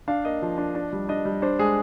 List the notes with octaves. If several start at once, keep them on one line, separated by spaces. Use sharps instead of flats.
D4 F5
A#3 D#5
F3
D4
D4
G3
D4 D#5
G3
D4 C5
G#3 G#4